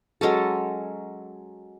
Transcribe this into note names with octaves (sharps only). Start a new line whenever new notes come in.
F#3 G#3 C#4 A4